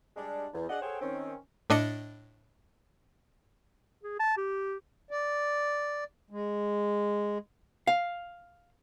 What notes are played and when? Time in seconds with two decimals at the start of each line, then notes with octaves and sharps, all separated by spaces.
0.17 G3 G#3 D4
0.54 E2
0.69 D4 G#4 D5 D#5 F#5
0.82 G#4 A4 C5 C#5 F#5 G5
1.01 D#3 C4 C#4
1.70 A2 D4 D#5 C#7
4.03 G#4
4.19 A5
4.37 G4
5.11 D5
6.31 G#3
7.87 F5